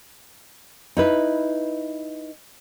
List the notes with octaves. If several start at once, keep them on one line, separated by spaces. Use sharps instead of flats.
D#4 E4 B4